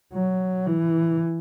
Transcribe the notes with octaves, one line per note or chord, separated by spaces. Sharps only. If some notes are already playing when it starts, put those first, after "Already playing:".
F#3
E3